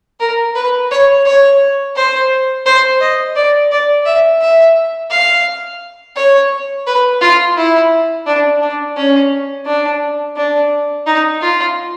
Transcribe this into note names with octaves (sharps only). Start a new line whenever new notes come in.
A#4
B4
C#5
C#5
C5
C5
D#5
D5
D5
E5
E5
F5
C#5
B4
F4
E4
D4
D4
C#4
D4
D4
D#4
F4